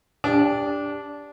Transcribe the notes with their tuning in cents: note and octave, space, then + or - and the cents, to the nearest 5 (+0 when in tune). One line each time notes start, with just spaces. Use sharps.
D4 -15 G4 +20